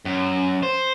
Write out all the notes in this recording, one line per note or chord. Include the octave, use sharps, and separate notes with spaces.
F#2
C5